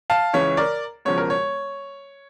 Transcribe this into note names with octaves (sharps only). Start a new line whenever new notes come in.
F5 A5
C#2 C#3 E3 C#5
A#4 D5
E1 E2 C#3 F3 C#5
A#4
C#5